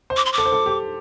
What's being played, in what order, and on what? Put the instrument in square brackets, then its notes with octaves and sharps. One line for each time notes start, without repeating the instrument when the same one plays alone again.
[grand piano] C5
[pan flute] D6
C6
D6
[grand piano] A4
C5
A4
G4